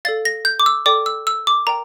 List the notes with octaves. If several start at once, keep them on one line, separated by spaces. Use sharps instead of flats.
A4 D5 F5 A6
A#6
G6
D6
E6
A4 D5 G5 D6
E6
E6
D6
A#4 D5 G5 A#5